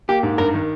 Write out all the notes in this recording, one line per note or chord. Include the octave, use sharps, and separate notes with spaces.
A#3 G4
G#2
G2 A#4
D#3